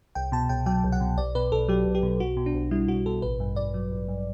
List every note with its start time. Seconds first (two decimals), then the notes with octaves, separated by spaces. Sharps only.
0.15 C2 G5
0.32 B2 A5
0.49 C2 G5
0.66 F#3 G5
0.84 C2
0.92 F#5
1.01 B2
1.17 B1 D5
1.35 B2 B4
1.52 B1 A4
1.68 F#3 G4
1.86 B1
1.95 G4
2.03 B2
2.20 B1 F#4
2.37 B2
2.46 D4
2.54 B1
2.71 G3 E4
2.88 B1 F#4
3.06 B2 A4
3.22 A1 B4
3.40 G2
3.56 A1 D5
3.74 F#3
3.92 A1
4.08 G2